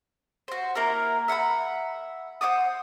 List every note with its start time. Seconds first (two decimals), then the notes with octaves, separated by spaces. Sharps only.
0.48 F#4 C5
0.75 A#3 E4 A#4 A#5
1.28 E5 F#5 G5 B5
2.41 C5 F#5 D6 D#6